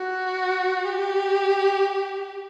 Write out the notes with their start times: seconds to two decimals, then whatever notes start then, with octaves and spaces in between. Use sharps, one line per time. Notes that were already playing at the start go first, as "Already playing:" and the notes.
Already playing: F#4
0.85 G4